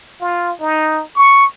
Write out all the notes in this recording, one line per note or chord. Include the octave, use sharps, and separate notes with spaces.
F4
D#4
C#6